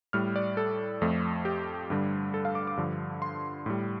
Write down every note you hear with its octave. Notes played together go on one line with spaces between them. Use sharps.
A2 G3 F6
D5
A4
F2 F3 A3
G4
G2 D3 G3
A4
F5
D6
D6
G2 D3 F3
C6
A2 G3